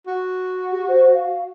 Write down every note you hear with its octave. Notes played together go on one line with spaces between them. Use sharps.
F#4
G4
C5
F5